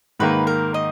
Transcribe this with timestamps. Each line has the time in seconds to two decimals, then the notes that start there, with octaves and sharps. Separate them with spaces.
0.20 G#2 D#3 A#3 B4
0.47 A#4
0.74 D#5